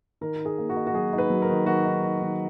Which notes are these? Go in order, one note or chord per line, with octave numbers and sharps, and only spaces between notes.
D#3 A#4
D#4
G#4
A#3
F#4
D#4
F#4
F#3 G#4
D#4
B4
F#3
A#4
D#3
D#3 F#4
D#4
D#4
D#3